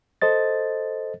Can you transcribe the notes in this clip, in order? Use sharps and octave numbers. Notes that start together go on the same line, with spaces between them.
A4 C5 D#5 A6